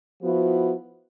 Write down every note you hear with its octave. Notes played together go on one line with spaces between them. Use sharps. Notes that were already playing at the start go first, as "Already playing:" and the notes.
F3 B3 E4 F#4